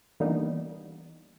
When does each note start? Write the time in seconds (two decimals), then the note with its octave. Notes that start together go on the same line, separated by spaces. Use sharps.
0.20 E3 G3 A#3 B3 D4 D#4